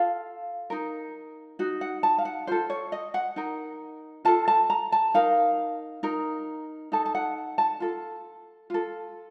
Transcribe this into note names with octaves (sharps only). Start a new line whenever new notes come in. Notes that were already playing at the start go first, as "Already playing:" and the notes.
Already playing: F4 A4 F5
D#4 A#4
D#4 F#4
F#5
A5
F5
F#5
F4 A4 C5
C#5
D#5
F#5
D#4 A#4
F4 A4 A5
A5
A#5
A5
D#4 A#4 F5
D#4 A#4
D#4 A4 A5
A5
F#5
A5
F4 A4
F4 A4